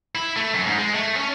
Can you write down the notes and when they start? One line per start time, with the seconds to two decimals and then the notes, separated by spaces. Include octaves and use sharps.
0.15 E4
0.36 A3
0.54 F#2
0.67 G#2
0.79 G#3
0.95 A3
1.16 C#4